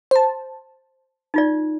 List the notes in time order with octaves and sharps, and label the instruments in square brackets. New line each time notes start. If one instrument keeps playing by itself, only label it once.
[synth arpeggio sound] C5 A5
[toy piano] D#4 F4 D5